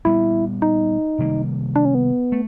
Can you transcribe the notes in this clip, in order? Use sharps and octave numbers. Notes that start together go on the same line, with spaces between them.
A#2 G3 B3 E4
D#4
C3 D#3 G3 A#3
D4
C#4
B3
A3